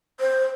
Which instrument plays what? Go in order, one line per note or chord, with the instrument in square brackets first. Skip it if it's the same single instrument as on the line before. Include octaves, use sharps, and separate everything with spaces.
[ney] C5